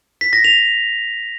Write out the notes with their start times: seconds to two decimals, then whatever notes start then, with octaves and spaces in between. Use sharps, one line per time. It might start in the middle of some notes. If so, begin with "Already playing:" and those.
0.21 B6
0.33 A#6
0.44 F7